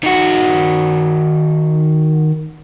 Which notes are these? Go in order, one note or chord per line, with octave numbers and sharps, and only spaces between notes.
D#3 F#4